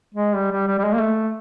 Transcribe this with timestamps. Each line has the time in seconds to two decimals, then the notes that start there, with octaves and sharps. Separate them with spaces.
0.15 G#3
0.36 G3
0.51 G3
0.67 G3
0.78 G3
0.84 G#3
0.94 A#3
1.00 A3